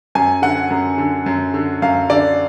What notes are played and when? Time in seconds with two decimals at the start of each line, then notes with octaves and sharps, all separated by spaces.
0.15 F#2 G#5
0.42 D3 F#5
0.70 F#2
0.98 D3
1.26 F#2
1.54 D3
1.82 F#2 F5
2.10 D3 D5